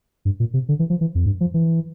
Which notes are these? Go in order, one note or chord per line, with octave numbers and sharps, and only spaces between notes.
G2
A#2
C3
D3
E3
F3
E3
F2
G2
F3
E3